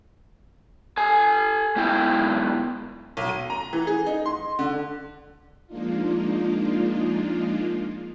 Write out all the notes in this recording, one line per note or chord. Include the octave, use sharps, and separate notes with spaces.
A4 G#5
G#2 B3 E4 G5
B1
D#7
A#5
E3
G#4
D#4
C6
D3
F3 G#3 A#3 D4 D#4 F4